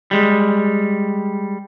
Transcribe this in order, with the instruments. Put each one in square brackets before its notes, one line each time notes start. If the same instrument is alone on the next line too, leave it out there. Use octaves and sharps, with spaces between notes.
[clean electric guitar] G3 G#3